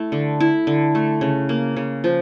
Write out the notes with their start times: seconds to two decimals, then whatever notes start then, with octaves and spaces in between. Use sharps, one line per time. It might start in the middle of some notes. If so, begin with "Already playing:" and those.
Already playing: A3 E4
0.12 D3
0.40 E4
0.67 D3
0.95 A3
1.21 C#3
1.49 A#3
1.76 C#3
2.04 F3